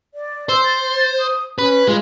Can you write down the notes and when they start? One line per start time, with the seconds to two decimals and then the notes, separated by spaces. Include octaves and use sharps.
0.14 D5
0.49 C5 E6
0.64 A6
1.20 D#6
1.58 C#4 B4
1.88 G#3 F4